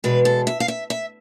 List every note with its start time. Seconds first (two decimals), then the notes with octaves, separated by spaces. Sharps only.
0.04 E2 B2 G#3 B4
0.25 A4
0.47 E5
0.60 F5
0.68 E5
0.90 E5